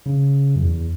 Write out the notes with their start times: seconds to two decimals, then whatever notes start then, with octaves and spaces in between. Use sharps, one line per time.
0.06 C#3
0.56 F#2
0.62 E2